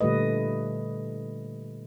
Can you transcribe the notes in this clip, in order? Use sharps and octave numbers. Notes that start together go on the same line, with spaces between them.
A#2 D3 G3 A3 B4 D#5